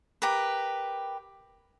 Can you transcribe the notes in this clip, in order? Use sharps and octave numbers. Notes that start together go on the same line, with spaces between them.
G4 A#4 B4